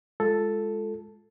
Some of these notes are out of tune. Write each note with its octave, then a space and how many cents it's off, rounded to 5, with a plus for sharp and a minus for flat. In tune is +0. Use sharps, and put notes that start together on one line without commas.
G#3 +0 F4 +0 A4 +0